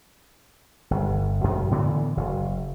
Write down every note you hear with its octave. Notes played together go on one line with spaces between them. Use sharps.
G1
F#2
A2 D3 E3 B3
F#1